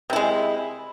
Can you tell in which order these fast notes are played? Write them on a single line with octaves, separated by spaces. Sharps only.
C3 E4 G#3